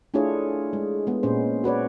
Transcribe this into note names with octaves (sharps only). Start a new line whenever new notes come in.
A3 D4 E4 F4 G#4 C#5
G#3
G#3 B3
A#2 C#4 C5
F#4 B4 C#5 D5